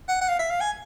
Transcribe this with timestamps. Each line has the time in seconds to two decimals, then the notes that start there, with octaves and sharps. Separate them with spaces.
0.09 F#5
0.21 F#5
0.29 F5
0.39 E5
0.51 F5
0.61 G#5